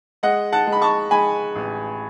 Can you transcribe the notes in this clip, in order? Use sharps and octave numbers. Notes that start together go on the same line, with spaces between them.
G#3 D#5 F#5
F#5 A5
G#3
B5
A5 C#6
G#3 G#5 B5
A1